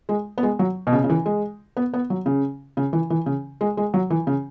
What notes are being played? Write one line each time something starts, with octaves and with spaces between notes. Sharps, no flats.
G#3
B3
G#3
F#3
B2
C#3
C#3
E3
G#3
B3
B3
F#3
C#3
C#3
E3
E3
C#3
G#3
G#3
F#3
E3
C#3